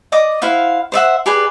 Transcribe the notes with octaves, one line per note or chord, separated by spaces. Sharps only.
D5 D#5 D6 D#6
E4 C5 F5 F#5
C5 D5 E5 F#5
G4 G#4 B4 D5